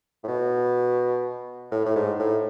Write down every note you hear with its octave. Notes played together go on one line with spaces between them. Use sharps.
A2
B2
A2
A2
G#2
A2